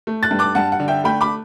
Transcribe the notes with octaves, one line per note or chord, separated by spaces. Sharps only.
A3
F#6 A6
G2
D6 F#6
G2 F#5 A5
F#5
D3
E5 G5
A3 G5 B5
B5 D6